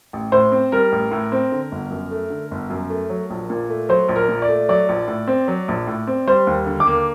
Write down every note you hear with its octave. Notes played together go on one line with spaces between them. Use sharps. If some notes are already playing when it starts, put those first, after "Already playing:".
A1
A2 C5
C4
G3 A#4
A1
A2
C4
D3
G1
F#2
A3
D3
G1
F#2
A3
F#3
A#1
A#2
A3
F#3 C5
A#1
A#4
A#2
D5
A3
F#3 D5
A#1
A2
C4
F#3
A#1
A2
C4
G3 C5
D#2
D3
D6
A#3